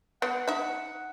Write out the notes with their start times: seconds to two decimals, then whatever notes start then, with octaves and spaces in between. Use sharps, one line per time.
0.22 B3 F#5
0.48 D#4 E5